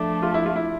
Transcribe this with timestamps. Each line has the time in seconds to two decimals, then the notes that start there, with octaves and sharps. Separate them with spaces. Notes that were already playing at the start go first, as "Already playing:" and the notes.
Already playing: F3 A3 D4
0.23 F4
0.34 E4
0.46 F4
0.56 E4